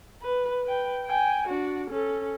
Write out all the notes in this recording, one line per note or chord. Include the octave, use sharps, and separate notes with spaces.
B4
B4 G5
G5 G#5
D4 F#4
C#4 A4